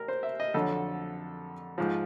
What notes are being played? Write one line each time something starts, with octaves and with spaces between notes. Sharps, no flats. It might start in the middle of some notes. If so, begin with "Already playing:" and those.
Already playing: A1 A#4
C5
E5
D#5
F2 D3 F#3 A4
G#2 F3